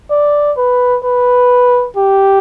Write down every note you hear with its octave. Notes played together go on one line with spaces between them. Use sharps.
D5
B4
B4
G4